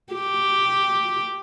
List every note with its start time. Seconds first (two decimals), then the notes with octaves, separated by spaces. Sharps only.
0.13 G4